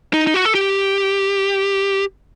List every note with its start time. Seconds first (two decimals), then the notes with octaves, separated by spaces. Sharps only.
0.14 D#4
0.27 D#4
0.34 F#4
0.45 A4
0.55 G4